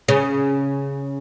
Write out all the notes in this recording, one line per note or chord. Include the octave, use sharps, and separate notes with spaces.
C#3 C#4